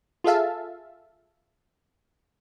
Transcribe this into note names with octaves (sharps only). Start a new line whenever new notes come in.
F4 G#4 A4 E5 F5 A5